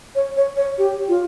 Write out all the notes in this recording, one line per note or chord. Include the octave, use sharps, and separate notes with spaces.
C#5
C#5
C#5
G4
F4